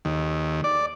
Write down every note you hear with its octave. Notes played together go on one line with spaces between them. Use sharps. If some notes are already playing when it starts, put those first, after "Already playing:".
D#2
D5